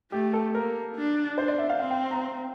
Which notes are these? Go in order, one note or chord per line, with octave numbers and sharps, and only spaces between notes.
A3 G4
A4
A#3 A#4
D4
D4 C5
D5
E5
F5
C4 F5
G5
A#5